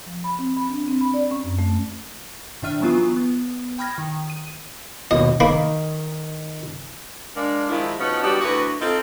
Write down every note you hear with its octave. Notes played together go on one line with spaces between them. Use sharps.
F3
B5
C4
B5
D4
C4
B5
D5
C#4
F#2
A3
A2 D#3 D4 E5 F6 D#7
E3 F#3 B3 F4
B3
G5 B5 D#6 F6 G#6 A#6
D#3 D#6
D#7
D#2 B2 D#5
D#3 A#3 D#4 B5
G#3 A#3 D4
D#3 F3 G#3 E4
F3 B3 C#4 D#4 F#4
G3 B3 D4 F#4 G4
D2 E3 F#4 B4
C4 D#4 F4 A4